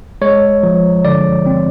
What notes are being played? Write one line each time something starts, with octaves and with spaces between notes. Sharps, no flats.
G#3 C#5
F3
D3 D5
C4